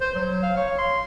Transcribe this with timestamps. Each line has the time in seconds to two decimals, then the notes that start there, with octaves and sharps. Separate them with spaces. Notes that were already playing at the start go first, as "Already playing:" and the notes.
0.01 C5
0.15 F#3
0.43 F5
0.56 C#5
0.79 C6